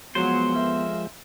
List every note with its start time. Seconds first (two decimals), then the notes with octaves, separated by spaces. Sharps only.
0.15 F3 F#3 G#3 B3 C5
0.55 F2 A#4 E5